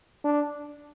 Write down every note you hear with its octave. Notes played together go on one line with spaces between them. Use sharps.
D4